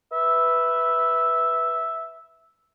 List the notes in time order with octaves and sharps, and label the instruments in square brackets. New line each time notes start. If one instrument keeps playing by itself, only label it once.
[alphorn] B4 [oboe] E5